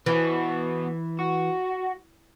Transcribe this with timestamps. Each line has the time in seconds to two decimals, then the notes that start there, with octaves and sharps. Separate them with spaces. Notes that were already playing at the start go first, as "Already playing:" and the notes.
0.06 E3 B3 F#4
1.19 F#4